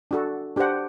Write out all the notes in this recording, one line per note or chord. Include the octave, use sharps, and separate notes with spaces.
D4 F#4 A4
D4 G4 C5 F#5